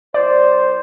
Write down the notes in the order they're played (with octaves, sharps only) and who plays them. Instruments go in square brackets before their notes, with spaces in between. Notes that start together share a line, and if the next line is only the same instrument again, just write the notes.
[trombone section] C2 C5 [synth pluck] D5